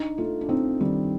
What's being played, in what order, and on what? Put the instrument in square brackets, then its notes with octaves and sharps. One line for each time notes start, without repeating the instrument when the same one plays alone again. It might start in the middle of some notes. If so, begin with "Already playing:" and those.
Already playing: [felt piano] D4 [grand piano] D#4
[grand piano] A3 [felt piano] F4
[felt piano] D4
[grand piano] C4 [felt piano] D#4
[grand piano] D#3 [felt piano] G3